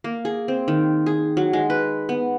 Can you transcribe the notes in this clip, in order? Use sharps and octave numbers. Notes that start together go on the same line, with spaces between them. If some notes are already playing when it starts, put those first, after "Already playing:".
A#3
G#4
C4
D#3
G#4
F#3
G#3
B4
B3